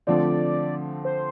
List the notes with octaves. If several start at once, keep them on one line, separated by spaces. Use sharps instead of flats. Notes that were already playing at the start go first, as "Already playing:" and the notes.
D3 F3 A3 C4 F4 D5
C5